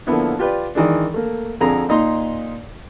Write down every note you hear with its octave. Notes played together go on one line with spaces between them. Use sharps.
D3 F3 A#3 B3 E4
F4 G4 B4 D5
D#3 E3 G#3 D4
A3 A#3
F2 D3 G#4 A#5
A#2 D#4 A#5 C6